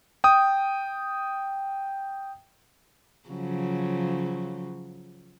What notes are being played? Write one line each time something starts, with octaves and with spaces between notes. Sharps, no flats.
G5 D#6
C#3 F3 F#3